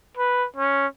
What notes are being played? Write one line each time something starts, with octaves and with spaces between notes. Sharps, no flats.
B4
C#4